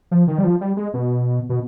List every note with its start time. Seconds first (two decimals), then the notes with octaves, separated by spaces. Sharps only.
0.11 F3
0.27 D#3
0.38 G3
0.44 F3
0.61 G3
0.77 G#3
0.94 B2
1.49 B2